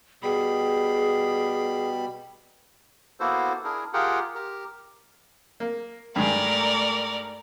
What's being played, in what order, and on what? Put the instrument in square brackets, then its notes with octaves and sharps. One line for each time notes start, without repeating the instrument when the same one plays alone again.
[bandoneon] B2 G3 B5 [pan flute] G#4
[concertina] A#3 B3 E4 F#4 A4 C5
D4 E4 G#4 A#4
F4 G4 G#4 A#4 F#5 G5
G4 A#4
[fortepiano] A#3
[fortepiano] G2 D#3 G#3 [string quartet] A3 A#4 D5